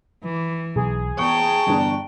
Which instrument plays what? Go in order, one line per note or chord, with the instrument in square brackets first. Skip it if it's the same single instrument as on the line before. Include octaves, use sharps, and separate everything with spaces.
[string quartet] E3
[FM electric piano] B1 [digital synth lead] G#4
[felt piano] E2 [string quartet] G5 A5 A#5 [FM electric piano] C#6
[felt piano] G1 E2 D4